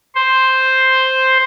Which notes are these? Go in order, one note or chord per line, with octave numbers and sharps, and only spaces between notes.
C5